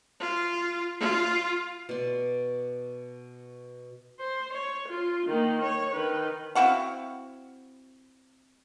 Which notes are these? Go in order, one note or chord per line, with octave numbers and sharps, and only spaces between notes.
F4
F4
B2 D5
C5
C#5
F4
D#3 A#3
C#5
D#3 B4
C4 E4 F#4 F5